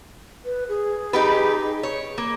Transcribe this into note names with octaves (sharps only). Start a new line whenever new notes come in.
B4
G#4
D#4 G4 B4
C#5
A#3